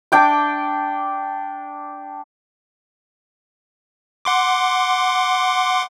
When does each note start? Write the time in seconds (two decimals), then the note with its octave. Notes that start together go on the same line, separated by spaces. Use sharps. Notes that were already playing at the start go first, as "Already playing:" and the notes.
0.12 D4 G5 D6
4.25 F#5 C6 D6